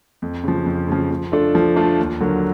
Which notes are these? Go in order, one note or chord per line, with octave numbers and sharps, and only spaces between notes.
F2
C#3 F3
F2
C#3 F3
F3
A3 D4 F4 A4
F3
A3 D4 F4 A4
D#2
D3 F#3 A#3